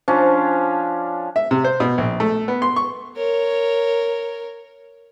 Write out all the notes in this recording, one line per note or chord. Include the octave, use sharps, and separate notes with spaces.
F3 C#4 D4
E5
C3
C5
B2
A#1
A3
B3
C6
C#6
A#4 C#5